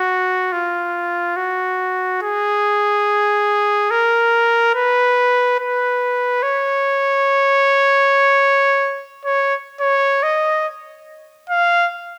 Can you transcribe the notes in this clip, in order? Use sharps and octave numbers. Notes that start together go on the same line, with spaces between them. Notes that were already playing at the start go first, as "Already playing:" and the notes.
Already playing: F#4
F4
F#4
G#4
A#4
B4
B4
C#5
C#5
C#5
D#5
F5